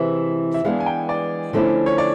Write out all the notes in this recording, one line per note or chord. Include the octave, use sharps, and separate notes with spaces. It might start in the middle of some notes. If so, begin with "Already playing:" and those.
Already playing: C3 E3 G#3 E5
E5
E3 G#3 B3 D4 F5
G#5
G5
D5
D3 F3 A3 C#4 E4
C#5
D5